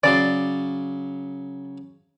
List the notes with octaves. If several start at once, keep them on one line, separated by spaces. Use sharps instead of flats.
C#3 F#3 D5 C6